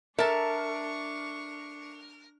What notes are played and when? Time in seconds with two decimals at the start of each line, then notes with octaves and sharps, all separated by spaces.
0.19 D4 A4 A#4 E5 A5 C#6